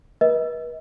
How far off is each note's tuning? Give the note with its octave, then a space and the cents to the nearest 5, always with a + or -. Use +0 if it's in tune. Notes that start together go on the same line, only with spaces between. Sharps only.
B4 -40 D#5 +35